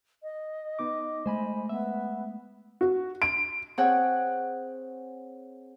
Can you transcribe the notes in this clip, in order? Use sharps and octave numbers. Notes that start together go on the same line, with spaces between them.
D#5
B3 D#4 D6
G#3 A3 C5 G#5 B5
B3 E5
F#4
D7
C4 G#4 C#5 F#5 G5